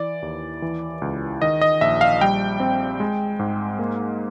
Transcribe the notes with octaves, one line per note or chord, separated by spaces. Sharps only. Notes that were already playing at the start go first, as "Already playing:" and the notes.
Already playing: E3 D5
D#2
E3
C#2
D#3 D#5
D#5
A#1 E5
F5
G3 G5
C4
G#3
G#2
A#3